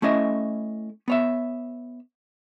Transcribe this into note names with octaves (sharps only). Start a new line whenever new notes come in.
A3 C#4 E4 D#5 E5
B3 C#5 E5